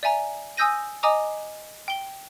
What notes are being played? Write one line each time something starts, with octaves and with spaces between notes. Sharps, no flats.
D5 E5 G#5 A#5
G#5 D#6 E6 G6 A#6 D#7
D#5 G#5 A#5 D6 D#6
G5 G7